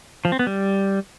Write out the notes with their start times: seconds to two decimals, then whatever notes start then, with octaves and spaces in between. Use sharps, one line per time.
0.25 F3
0.32 C4
0.39 B3
0.47 G3